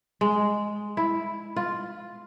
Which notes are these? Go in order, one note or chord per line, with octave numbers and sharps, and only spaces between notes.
G#3
E4
F4